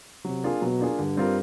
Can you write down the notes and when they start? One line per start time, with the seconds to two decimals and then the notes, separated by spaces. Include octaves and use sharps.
0.25 C3 F#3
0.43 A#3 D4 F4 G#4
0.61 B2 F#3
0.79 A#3 D4 F4 G#4
0.98 G2 D3
1.17 G3 C4 F4 A#4